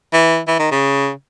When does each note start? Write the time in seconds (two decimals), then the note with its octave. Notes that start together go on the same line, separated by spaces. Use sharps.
0.13 E3
0.47 E3
0.59 D#3
0.71 C#3